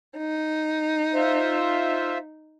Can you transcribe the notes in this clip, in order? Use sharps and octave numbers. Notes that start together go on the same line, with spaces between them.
D#4
F4 C5 E5